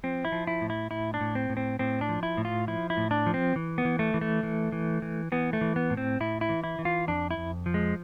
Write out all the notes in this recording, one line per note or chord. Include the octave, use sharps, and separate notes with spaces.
F3 C4
E4
F3
E4
A2
E4
A2 E4
D4
A2
C4
A2
C4
A2 C4
D4
F3
E4
A2
F4
F3 E4
E4
A2
D4
F3
C4
E3
B3
E3
A3
E3
A3
E3
E3
E3
E3 B3
A3
E3
B3
A2
C4
A2 E4
E4
E3
E4
E3
F4
F2 D4
E4
F2
F3
G#3